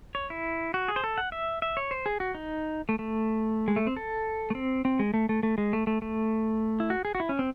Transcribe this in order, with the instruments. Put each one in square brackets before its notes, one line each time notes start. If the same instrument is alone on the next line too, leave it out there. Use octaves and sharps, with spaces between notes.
[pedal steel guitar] C#5
E4
F#4
G#4
C5
A4
F#5
E5
E5
C#5
C5
G#4
F#4
D#4
A3
A3
G#3
A3
C4
A4
A3
C4
C4
G#3
A3
A3
A3
G#3
A3
A3
A3
E4
F#4
G#4
F#4
E4
C#4
C4